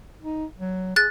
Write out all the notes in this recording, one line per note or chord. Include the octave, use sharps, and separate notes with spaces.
D#4
F#3
G#4 F#6 A6